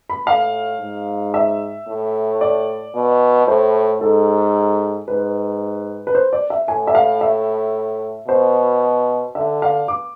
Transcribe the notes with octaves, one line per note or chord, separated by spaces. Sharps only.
B5
A2 F5
G#2
E5
A2
D5
B2
A2 C5
G#2 A4
G#2 B4
B4
C5
D5
E5
A2 G#5
E5
F5
E5
B2 C5
D3 E5
F5
D6